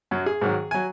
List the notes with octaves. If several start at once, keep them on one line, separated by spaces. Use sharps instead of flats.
F#2 F#3
G#4
G#2 D#3 F#3
F#3 G#5